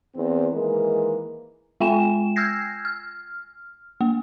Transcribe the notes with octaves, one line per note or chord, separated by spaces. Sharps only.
E2 C4
D#3 E3 G#3 A#3 A#4
G#3 F4 G5 G#5 E7
E6 F6 G6 G#6 A#6 C7
F6
A#3